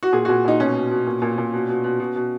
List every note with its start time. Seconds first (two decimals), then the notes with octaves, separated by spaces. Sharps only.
0.03 F#4
0.12 A#2 G#4
0.25 A#2 F#4
0.44 A#2 D#4
0.60 B2 C#4
0.75 B2
0.91 B2
1.06 A#2
1.22 A#2
1.38 A#2
1.53 B2
1.69 B2
1.84 B2
2.00 B2
2.16 B2